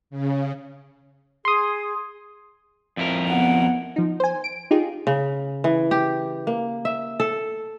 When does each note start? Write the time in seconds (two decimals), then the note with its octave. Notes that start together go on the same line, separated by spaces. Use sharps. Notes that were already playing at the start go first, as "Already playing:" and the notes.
0.10 C#3
1.45 G#4 C6 D#6
2.97 F2 E4 A#4
3.29 B3 F#5
3.96 F3 D#4
4.20 C5 G#5
4.44 D7
4.71 D#4 F4 G4 G#4
5.07 C#3
5.64 E3
5.91 G4
6.47 A#3
6.85 E5
7.20 A4